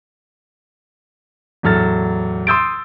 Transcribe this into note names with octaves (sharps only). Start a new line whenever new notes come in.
E2 A2 F#3 A4 F6 A6
C6 D#6 E6 G6 A6 D7